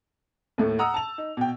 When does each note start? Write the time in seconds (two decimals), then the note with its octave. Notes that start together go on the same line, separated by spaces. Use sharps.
0.58 D#2 A2 A3
0.79 F#5 A#5 D#6 E6
0.94 A5 F7
1.18 D#4
1.37 B2 G5